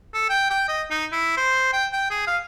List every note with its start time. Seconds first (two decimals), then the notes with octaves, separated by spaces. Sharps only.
0.14 A4
0.29 G5
0.50 G5
0.68 D#5
0.90 D#4
1.12 E4
1.37 C5
1.73 G5
1.93 G5
2.10 G#4
2.27 F5